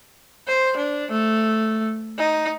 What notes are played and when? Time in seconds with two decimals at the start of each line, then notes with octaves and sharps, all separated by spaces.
0.48 C5
0.77 D4
1.11 A3
2.18 D#4